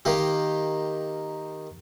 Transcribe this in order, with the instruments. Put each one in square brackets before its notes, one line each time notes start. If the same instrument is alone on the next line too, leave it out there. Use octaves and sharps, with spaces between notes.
[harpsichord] D#3 A#3 G4